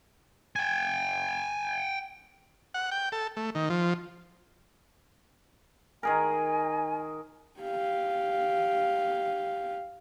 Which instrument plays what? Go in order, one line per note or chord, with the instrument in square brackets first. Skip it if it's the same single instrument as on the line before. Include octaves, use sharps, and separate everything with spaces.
[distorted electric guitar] G5 G#5
[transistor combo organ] F#5
G5
A4
A3
D#3
F3
[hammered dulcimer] D#3 G#4 A#4 [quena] G#5
[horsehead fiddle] G4 F5